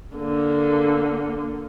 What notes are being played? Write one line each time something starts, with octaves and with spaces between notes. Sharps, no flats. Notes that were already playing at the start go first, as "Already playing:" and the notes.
D3 A#3